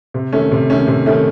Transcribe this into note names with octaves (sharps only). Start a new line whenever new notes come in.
C3
D#3 A3 C#4
C3
D#3 A3 C#4
C3
D#3 A3 C#4